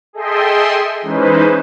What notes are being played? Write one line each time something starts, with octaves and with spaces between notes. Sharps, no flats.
G#4 A4 D#5 E5 G5 C6
E3 G#3 C#4 D#4 B4 C5